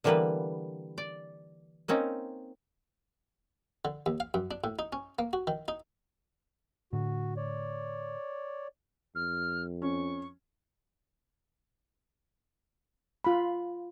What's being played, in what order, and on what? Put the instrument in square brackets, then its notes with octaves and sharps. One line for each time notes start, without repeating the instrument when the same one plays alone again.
[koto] D3 E3 G3 A#3 B3 B4
D5
A#3 C4 C#4 D#4
[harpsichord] D3
D#2
F5
F#2
D4
A2
D#4
C#4
A#3
F#4
D#3
D#4
[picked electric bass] A2 D3 [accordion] F#4
[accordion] C#5 D5
[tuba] F2 [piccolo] F6
[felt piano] C#4 [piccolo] C#6
[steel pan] F4 B5